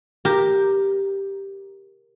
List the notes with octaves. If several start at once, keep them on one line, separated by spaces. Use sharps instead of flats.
G4 A#4